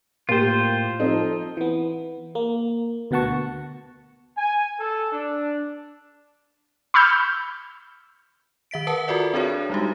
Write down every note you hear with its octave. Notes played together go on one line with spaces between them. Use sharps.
A2 A#3 F4 G4 C5
F3 C4 D#4 A4
E3 B3
A#3
D2 B2 B3 F#5 A5 C#6
G#5
A4
D4
B5 C#6 E6 F6 G6
D#3 E5 B6 D7
A#4 B4 F#5 A5
F4 F#4 A4 A#4 D5 E5
C4 D4 F#4 G#4 A#4 C#5
G3 G#3 D#4 F#4 G4